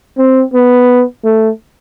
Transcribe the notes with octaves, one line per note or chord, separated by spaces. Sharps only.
C4
B3
A3